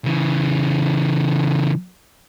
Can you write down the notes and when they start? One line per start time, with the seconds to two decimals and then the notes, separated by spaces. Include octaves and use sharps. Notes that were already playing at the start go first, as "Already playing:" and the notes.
0.05 C#3 E3